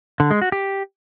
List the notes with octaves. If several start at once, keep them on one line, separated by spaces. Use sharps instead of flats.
D3
G#3
F#4
G4